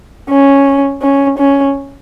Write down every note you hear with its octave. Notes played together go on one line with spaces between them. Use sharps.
C#4
C#4
C#4